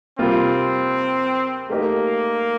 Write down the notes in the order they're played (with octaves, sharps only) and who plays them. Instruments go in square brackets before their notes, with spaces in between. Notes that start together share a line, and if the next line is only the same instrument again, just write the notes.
[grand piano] C3 G3 A#3 F4 [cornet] C4
[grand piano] A3 D#4 G4 A#4 D#5 [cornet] A#3